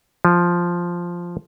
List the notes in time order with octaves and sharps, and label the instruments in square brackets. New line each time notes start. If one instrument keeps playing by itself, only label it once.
[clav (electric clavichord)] F3